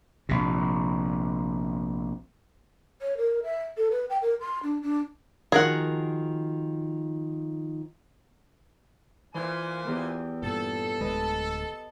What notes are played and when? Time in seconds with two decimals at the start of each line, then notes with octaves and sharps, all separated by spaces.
0.29 A#1 C3
3.01 C#5
3.17 A#4
3.43 E5
3.77 A4
3.91 B4
4.09 G5
4.22 A#4
4.40 C6
4.63 D4
4.82 D4
5.52 D#3 F3 F#4 G#4 A#4 F#5
9.34 A#2 E3 C5 G#5
9.87 E2 E3 G4
10.43 G2 A#2 A4
11.01 D1 D2 G#3 B4 D#5 A5